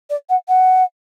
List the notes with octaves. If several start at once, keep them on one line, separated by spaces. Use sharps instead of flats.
D5
F#5
F#5